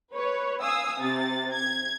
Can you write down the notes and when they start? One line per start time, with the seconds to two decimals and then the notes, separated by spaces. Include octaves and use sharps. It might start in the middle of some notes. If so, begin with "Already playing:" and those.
0.15 B4 C#5
0.61 F5 G#5 D#6 E6
1.00 C3 A6
1.52 G#6